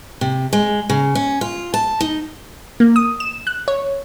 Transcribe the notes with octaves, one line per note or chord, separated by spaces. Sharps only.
C3
G#3
C#3
C#4
F4
A5
D#4
A#3
D#6
E7
F#6
C#5